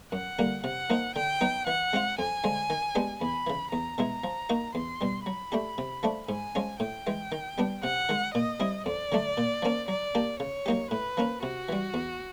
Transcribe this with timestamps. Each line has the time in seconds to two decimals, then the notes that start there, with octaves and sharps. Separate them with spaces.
0.12 F#2 F#5
0.39 D3 G3 A#3
0.64 C3 F#5
0.90 F3 A#3 D#4
1.15 D3 G5
1.41 F#3 B3 D#4
1.67 E3 F#5
1.93 G#3 C4 F4
2.19 F2 G#5
2.44 D3 F3 G#3
2.70 D#3
2.95 G#3 B3 D4 G4
3.21 E2 B5
3.47 C#3 E3
3.72 E2 A#5
3.98 B2 G#3 B3 E4
4.24 F3
4.49 A#3 D#4 F#4
4.75 E2 C6
5.01 B2 G3
5.26 F#3 B5
5.52 A3 D4 G4
5.78 C3
6.03 F3 A3 D4
6.29 G#2 G#5
6.55 F3 G#3 C#4
6.80 A2 G5
7.07 E3 G#3
7.32 D#3
7.58 G3 B3 D4
7.83 C3 F#5
8.09 D#3 G#3
8.34 A#2 D#5
8.60 G3 C4 E4
8.86 F2 D5
9.12 D3 F#3 A3 D4
9.38 A#2
9.62 F3 A#3 C#4
9.88 F#3 D5
10.15 A#3 D4 G4
10.40 C#3 C#5
10.66 F#3 A#3 D#4 G4
10.91 A2 B4
11.17 F3 A#3 C#4
11.43 C3 F#4
11.69 E3 G3
11.94 E2